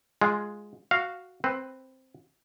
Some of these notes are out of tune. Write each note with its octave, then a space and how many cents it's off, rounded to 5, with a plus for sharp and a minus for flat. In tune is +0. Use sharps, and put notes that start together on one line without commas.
G#3 +0 F4 +10
F#4 +0 F5 +0
C4 +0 B4 +15